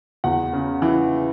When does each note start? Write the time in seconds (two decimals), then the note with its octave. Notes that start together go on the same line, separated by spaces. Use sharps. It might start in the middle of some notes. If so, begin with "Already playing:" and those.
0.24 E2 F#5
0.53 C#3
0.82 E3